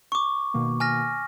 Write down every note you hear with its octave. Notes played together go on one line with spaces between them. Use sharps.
C#6 D6
B2 D#3 A#3
G#5 F6 A#6